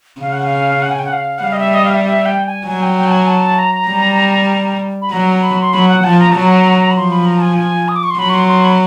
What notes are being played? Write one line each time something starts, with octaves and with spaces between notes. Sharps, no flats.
C#3 F5
F#5
F5
F#5
G#5
G5
F#5
F5
F#5
G3 F5
D#5
E5
D#5
F5
E5
E5
G5
G#5
F#3 G#5
G5
G5
A5
G#5
A5
A#5
G3
B5
F#3 A#5
B5
C6
F#3 B5
F#5
F3 A5
A#5
F#3 A5
A#5
B5
F3 C6
B5
A#5
A5
G#5
G#5
D#6
D6
C#6
C6
F#3 B5
C#6
C6
C6
B5